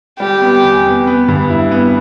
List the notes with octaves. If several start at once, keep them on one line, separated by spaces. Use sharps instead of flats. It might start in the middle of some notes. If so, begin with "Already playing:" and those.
G3 G4
B3
E2
B3
B3
G2
E4
B3